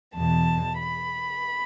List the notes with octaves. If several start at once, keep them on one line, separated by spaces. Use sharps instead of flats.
E2 B2 A5
B5